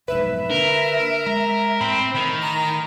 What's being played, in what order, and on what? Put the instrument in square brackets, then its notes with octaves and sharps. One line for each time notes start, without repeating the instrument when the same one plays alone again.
[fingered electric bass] F1 B1 G#2 [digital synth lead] B4 [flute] E5
[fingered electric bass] D3 A#3 D4 [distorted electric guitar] A#4
[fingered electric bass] G#3 [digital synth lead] A#5
[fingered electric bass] A2 [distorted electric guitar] C4 [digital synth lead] B5
[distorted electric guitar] D#3 [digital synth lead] B5
[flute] A#5